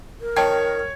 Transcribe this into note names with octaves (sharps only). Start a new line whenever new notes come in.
A#4
D#3 C#5 G5 A5 G#6